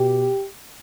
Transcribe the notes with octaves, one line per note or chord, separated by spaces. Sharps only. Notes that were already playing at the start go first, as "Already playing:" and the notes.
Already playing: B2 G4